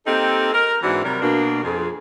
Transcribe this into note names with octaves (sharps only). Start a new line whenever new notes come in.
A#3 C4 D#4 G4 A4
A#4
G#2 E3 C4 D4 E4 F#4
C3 F#3 G3 A#4
B2 A#3 D4
F2 G#4